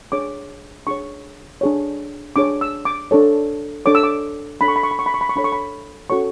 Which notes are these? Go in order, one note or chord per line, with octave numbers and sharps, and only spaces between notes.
D4 G#4 C#5 D6
D4 G#4 C#5 C#6
D4 G#4 C#5
D4 G#4 C#5 D6
E6
D6
D4 A4 C#5
D4 A4 C#5 D6
E6
D6
D4 A4 C#5 B5
C#6
B5
C#6
B5
C#6
B5
C#6
B5
C#6
D4 A4 C#5 B5
C#6
B5
C#4 F#4 A4 C#5 C#6